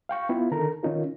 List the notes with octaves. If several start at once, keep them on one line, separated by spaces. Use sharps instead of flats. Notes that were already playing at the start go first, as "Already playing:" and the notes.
F5 G5 C#6
B3 E4 F4
D3 D#3 A4 A#4 A#5
D#3 C#4 D#4 F4 A#4